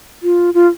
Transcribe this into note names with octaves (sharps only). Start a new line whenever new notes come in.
F4
F4